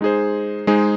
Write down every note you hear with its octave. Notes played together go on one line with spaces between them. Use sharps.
G#3 D#4 G#4 C5
G#3 D#4 G#4 C5